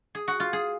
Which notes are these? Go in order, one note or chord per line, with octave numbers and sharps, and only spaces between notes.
G#4
F#4
F4
G#4